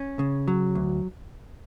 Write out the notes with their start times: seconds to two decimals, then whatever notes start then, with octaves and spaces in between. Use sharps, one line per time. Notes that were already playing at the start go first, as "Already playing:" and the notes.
Already playing: C#4
0.19 C#3
0.48 F#3
0.75 D2